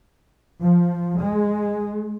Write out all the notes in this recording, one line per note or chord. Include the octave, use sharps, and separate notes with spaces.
F3
G#3